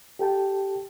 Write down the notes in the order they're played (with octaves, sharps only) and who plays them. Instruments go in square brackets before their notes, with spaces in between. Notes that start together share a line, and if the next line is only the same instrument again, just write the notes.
[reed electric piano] G4 A4 G5 A5